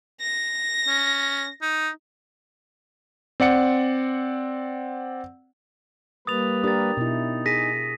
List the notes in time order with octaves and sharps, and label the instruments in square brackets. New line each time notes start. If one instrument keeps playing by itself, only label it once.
[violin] A#6
[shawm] C#4
D#4
[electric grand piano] C4 D5 F#5 C#7
[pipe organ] G3 A#3 B4 [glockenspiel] D#6 A6 F7
[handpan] D4 G4 A#4 [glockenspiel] D#6 A6
[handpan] B2 E4 [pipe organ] D#4
[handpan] G#4 [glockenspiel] A#6 B6 D#7